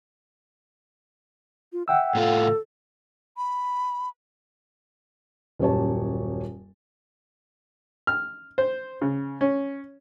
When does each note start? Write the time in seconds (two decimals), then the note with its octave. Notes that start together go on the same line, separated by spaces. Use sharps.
1.73 F4
1.88 E5 F#5 G5 E6
2.15 A2 F4 A4
3.37 B5
5.59 D#1 F#2 G4 C#5 A5
8.07 F6
8.58 C5
9.01 C#3
9.41 C#4